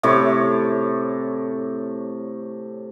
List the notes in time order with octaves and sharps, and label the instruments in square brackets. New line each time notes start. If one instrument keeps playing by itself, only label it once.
[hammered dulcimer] A2 C3 C#5 D6